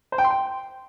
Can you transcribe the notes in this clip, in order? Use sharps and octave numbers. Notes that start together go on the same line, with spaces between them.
C5
G5
C6
G5